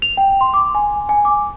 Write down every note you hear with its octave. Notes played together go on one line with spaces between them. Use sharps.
F7
G5
C6
D6
G#5
G#5
D6